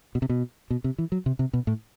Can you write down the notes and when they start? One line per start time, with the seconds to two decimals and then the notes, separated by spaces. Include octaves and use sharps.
0.15 B2
0.22 C3
0.29 B2
0.70 B2
0.84 C3
0.98 E3
1.12 F#3
1.26 C3
1.39 C3
1.53 B2
1.67 A2